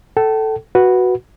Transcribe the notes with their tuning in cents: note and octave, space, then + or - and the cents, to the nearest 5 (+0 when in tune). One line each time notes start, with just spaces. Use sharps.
A4 +0 G5 -40
F#4 +0 B4 -5